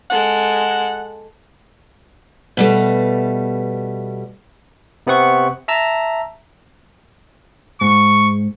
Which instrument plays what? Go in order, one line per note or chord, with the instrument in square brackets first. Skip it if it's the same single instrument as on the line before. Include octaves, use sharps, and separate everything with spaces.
[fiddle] G#3 A4 [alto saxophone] F#5
[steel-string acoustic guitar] B2 G3 A3
[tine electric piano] C3 B3 C4 F#5 C#6
E5 A5 A#5 E6
[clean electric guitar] G#2 [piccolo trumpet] C#6